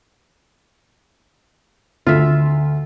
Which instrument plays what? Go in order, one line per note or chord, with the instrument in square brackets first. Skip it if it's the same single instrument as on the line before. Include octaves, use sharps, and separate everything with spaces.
[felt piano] D2 [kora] F4 E5